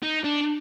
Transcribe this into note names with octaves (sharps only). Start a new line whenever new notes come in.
D#4
D4